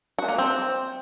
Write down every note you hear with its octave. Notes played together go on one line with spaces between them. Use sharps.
F#4
A#3
C4